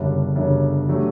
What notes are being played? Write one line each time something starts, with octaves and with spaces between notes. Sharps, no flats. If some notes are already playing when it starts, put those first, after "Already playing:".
Already playing: G1 F#2 C#3 G3 D4
G1 F#2 C#3 G3 D4
F#3 A3 D4 G4